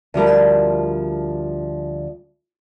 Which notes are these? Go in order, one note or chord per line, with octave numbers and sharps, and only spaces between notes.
D2 F3 G3 A#4